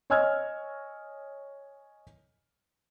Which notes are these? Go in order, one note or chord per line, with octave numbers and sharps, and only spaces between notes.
C#5 D#5 G#5 E6 F6 G#6